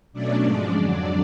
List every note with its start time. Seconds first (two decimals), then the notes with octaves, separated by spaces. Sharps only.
0.13 B2 F#3 A3 C#4 D4 D5
0.44 G#2 F3 G#3 C#4
0.74 F2 D3 F#3 D4 D5